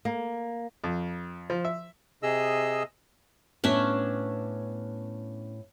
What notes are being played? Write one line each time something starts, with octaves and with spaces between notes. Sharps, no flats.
A#3
F2
F3
E5
C3 G#4 D#5 E6
A2 B3 C#4 D4 E5